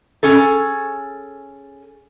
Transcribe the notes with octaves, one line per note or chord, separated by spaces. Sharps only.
C#4 G#4 A4